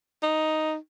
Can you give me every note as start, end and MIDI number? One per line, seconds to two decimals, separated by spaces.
0.23 0.75 63